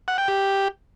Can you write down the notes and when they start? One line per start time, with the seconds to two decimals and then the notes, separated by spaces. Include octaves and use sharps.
0.08 F#5
0.18 G5
0.28 G4